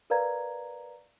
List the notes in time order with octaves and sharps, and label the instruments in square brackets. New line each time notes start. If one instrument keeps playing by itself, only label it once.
[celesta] A#4 B4 D5 F5 A#5 G#6